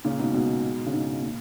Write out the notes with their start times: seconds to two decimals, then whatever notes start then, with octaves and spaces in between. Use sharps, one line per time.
0.05 A#2 C#3
0.19 G#2 B2
0.34 G#2 B2
0.86 C#3
0.93 G#2 B2
1.23 A#2